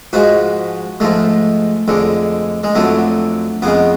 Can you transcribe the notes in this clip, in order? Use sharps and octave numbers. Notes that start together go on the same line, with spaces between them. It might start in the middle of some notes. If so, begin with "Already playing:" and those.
G#2 F3 G#3 F#4
G#2 F3 G#3 A3
F2 D3 G#3
G#3
F2 D3 F#3 A3
F2 C#3 G#3 B3